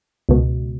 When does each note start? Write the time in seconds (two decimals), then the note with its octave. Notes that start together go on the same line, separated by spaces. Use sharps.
0.29 C#2 B2